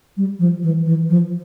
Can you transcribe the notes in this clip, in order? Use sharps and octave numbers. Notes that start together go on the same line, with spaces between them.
G3
F3
E3
E3
F3